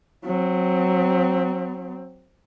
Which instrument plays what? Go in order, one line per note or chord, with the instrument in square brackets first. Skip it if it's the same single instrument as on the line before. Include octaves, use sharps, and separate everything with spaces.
[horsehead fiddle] F#3 C4